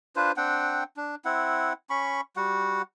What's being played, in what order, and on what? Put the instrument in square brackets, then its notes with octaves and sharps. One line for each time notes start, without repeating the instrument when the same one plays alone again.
[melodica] D4 F4 B4 C5
C4 D4 F#5 G5
D4
C4 E4 F#5
C#4 B5 C#6
G3 F#4 F#5